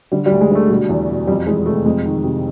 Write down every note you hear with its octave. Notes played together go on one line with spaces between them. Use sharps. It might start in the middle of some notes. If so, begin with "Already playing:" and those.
D3 G3
G3
D2
G#3
D3 A3
B2 G3
E2
B2
F2 G3
E3 G#3
C3 A3
F2 G#3
D#3
C3